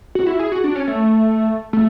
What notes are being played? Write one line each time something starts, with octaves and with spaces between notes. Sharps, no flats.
F#4
E4
G#4
F#4
D4
C#4
A3
A3